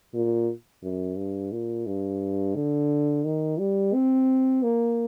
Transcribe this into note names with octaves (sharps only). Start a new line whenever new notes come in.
A#2
F#2
G2
A#2
G2
D3
D#3
G3
C4
A#3